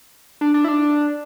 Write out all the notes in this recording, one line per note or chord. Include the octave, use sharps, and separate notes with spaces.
D4
D4
E4
D4